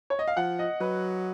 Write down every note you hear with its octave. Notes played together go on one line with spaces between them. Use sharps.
C#5
D#5
F5
F3 F#5
D#5
F#3 B4